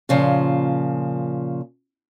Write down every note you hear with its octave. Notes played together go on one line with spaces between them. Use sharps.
A#2 C#3 F3